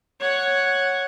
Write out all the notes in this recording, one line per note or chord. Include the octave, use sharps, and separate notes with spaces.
C#5 F#5